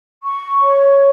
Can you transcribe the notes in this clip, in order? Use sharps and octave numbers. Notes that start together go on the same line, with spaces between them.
C#6
C#5